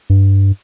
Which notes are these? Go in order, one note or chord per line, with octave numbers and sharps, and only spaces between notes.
G2